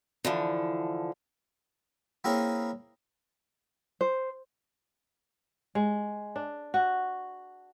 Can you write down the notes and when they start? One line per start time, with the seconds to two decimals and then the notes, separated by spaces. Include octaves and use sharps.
0.25 D3 E3 F3
2.24 A#3 C4 C#4 E4 G#4 A#4
4.01 C5
5.75 G#3
6.36 D4
6.74 F#4